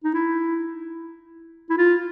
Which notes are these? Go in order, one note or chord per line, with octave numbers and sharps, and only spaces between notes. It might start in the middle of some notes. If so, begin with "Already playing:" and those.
D#4
E4
E4
F4